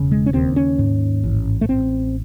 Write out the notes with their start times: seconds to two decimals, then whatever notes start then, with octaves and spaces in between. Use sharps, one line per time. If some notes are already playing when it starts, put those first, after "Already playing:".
Already playing: E1 C#3
0.11 G#3
0.26 C#4
0.33 D#2 C4
0.56 C#4
0.79 G#2
1.24 A1
1.61 A3
1.69 A1 C4